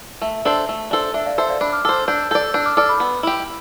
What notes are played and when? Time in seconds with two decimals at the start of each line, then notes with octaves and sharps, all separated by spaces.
0.21 A3 E5
0.45 D4 A4 C5
0.69 A3
0.91 D4 A4 C5
1.14 D4 E5
1.26 D5 F5
1.38 A4 C5 E5
1.49 D5 F5
1.61 D4 B5 D6
1.73 D6 F6
1.85 A4 C5 D6 F6
2.08 D4 E6 G6
2.31 A4 D5 E6 G6
2.54 D4 E6 G6
2.66 D6 F6
2.77 A4 D5 D6 F6
2.89 B5 D6
3.00 B3
3.23 E4 G4